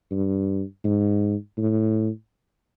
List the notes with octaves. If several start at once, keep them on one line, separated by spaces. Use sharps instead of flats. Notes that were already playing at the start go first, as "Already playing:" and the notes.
G2
G#2
A2